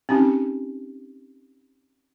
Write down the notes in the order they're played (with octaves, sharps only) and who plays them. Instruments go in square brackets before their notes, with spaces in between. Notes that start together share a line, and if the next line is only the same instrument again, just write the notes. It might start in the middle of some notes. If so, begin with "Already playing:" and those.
[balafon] C4 C#4 D#4 G4